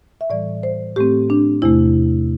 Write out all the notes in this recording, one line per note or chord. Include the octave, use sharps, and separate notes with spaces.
E5
A2 E3 G3 D5
C5
A2 A3 C4 G4
D4
E2 C3 A3 E4